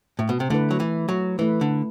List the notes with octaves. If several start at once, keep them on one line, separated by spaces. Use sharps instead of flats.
A2
B2
C3
D3 A3 E4 B4
F#3
E3
F#3
E3 A3 E4 B4
D3